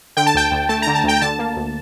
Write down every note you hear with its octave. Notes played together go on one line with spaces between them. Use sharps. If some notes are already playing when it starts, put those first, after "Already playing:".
D3 G5
A5
D2 G5
D2
A3 A5
D3 A#5
A5
D2 G5
G5
D3 A5
A#3
D2